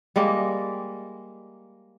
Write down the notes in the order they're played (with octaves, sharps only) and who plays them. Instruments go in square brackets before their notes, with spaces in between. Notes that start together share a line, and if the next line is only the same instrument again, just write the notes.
[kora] G3 G#3 A#3 A#4